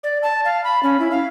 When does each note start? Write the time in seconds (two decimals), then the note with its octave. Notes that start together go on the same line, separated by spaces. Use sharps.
0.04 D5
0.23 A5
0.45 F5
0.64 B5
0.83 C#4
1.00 E4
1.11 F5